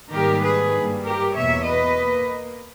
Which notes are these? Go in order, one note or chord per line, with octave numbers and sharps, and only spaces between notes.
G#2 D#3 G3 A#3 G4 A#4
G#4 B4
G2 G3 A#3
G4 A#4
E2 B2 A#3 C#5 E5
B4 D#5
A#3